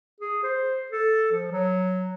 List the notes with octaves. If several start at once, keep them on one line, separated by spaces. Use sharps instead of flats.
G#4
C5
A4
F3
F#3